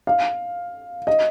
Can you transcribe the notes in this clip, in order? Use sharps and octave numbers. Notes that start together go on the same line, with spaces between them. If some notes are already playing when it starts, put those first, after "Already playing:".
F5
D#5